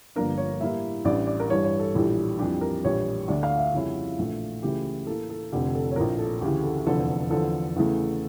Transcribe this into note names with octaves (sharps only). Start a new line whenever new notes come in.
G1 G2 F3 A#3 D4 A#4
C#5
A2 G3 A#3 E4 E5
A1 A2 E3 G3 D4 D5
D5
A#4
G2 E3 G3 C#5
C#5
A4
A#1 A2 E3 G3
F2 E3 G3 D4 G4
A#4
A#1 A2 E3 G3 C#5
D2 D3 A3 D4 D5
F5
E5
F2 C#3 G3 C#4 E4
A#1 A2 E3 A3
C#2 C#3 E3 A3 E4 G4
A2 E3 A#3 A4
A4
F1 F2 D3 G4
A4
C#5
A#1 A2 F3 A#4
A4
D2 C#3 E3 G4
A4
F1 E2 D3 F3 A4
E2 D3 F3 A4
E2 C#3 E3 A3